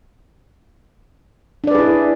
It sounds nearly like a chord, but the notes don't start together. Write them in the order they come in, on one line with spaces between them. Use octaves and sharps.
D4 D5 B4 G#4 E4